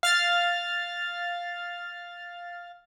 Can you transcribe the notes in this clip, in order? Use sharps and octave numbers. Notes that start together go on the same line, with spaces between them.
F5 F6 A6